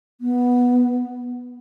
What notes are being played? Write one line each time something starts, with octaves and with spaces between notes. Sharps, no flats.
B3